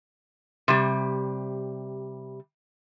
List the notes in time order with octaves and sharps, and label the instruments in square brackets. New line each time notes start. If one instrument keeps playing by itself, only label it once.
[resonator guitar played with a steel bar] C3 G3